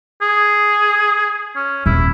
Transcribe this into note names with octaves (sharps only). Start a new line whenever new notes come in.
G#4
C#4
D#1 E4